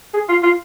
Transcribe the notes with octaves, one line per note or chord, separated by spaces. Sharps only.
G#4
F4
F4